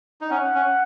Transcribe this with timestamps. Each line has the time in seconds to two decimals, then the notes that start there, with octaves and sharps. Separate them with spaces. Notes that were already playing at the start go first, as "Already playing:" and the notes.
0.21 D#4
0.30 C#4 F#5
0.55 C#4